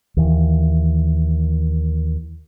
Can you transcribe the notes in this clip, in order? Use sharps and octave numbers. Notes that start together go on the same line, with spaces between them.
D#2 E3